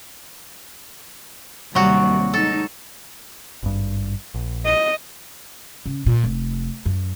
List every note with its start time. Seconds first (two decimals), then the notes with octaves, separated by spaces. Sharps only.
1.75 D#2 C3 F#3 G3 F#4
2.34 G#3 D#4 A4
3.63 G#1 G2
4.34 A#1
4.65 D#5
5.86 C#3
6.06 A#2
6.24 F1
6.86 F#2